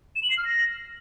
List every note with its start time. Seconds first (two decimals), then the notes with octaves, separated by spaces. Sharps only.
0.16 E7
0.23 F#7
0.30 C7
0.38 F6
0.45 A#6